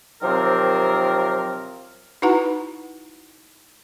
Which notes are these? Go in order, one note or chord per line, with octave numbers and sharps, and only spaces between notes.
C3 D#3 F3 F#3 C4 A#4
D#4 E4 F#4 B4 F#5 A#5